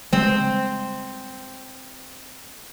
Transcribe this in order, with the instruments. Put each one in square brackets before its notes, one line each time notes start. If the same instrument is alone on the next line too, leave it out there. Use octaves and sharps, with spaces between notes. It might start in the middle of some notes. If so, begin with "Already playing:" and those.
[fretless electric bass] C#3 G3 G#3 [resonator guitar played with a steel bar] C4